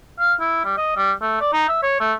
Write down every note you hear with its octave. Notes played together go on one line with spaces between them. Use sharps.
F5
E4
G3
D#5
G3
A3
D5
D#4
E5
C#5
A3